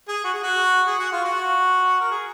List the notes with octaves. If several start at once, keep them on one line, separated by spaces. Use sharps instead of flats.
G#4
F#4
G#4
F#4
G#4
F#4
F4
F#4
A#4
G#4